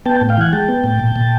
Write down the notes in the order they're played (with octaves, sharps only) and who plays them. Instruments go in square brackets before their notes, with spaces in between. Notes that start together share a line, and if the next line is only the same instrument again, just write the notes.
[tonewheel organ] B3 G5 A5
A2
F5 G5
E3 F#5 G#5
G#3 G5 A5
B3
A2
A#2
A#2